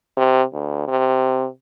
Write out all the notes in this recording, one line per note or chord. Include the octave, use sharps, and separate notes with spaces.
C3
D2
C3